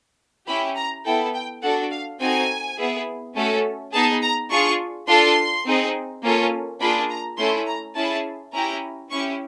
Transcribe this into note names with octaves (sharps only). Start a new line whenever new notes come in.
C#4 E4 G4 B5
A#5
B3 E4 A4 G5
G5
D4 F#4 A4 F#5
F5
C4 D#4 F#4 A4 G#5
B3 E4 G#4
A3 C#4 F#4 A4
B3 D#4 G#4 A5
A#5
D4 F4 G#4 C#6
D4 F4 A4 C6
C4 D#4 G#4
A#3 C#4 F4 A4
A#3 D4 F4 G#4 B5
A#5
A3 C#4 E4 A4 C6
A#5
C#4 E4 G#4 A5
C#4 E4 G4 A#5
C#4 E4 G4 C#6